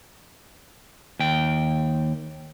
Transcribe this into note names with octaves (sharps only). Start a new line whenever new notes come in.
D#2 G5